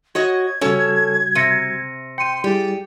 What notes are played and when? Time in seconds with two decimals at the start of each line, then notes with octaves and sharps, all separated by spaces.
0.15 F#4 C#5 D#5 G#6
0.61 C#3 G3 C#4 F#4 A4 C#5
1.35 C3 A#6 C#7 D#7
2.18 G5 C6 G6 C#7 D#7
2.44 G3 E4 G4 G#4 D5